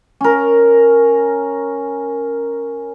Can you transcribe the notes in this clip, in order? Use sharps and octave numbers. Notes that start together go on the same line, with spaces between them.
C#4 A#4